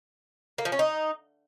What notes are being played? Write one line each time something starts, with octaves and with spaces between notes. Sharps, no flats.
A#3
F3
C#4
D#4